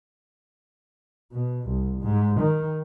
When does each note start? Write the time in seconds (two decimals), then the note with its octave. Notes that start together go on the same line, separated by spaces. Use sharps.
1.33 B2
1.68 C2
2.01 G#2
2.40 D#3